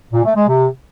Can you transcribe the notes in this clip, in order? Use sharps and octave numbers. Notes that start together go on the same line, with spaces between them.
A#2
A3
G#3
C3